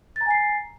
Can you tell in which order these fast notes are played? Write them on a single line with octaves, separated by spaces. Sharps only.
A6 A#5 G#5 C7